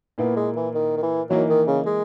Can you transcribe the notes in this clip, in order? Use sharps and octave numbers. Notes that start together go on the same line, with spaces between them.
A#2 A#3 B3 E4
G#3
E3
D#3
D#3
E3
E3 F#3 A#3 D#4
D#3
C#3
G#3